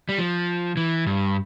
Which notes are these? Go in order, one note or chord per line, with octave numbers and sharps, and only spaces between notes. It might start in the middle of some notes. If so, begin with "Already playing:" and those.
G3
F3
E3
G2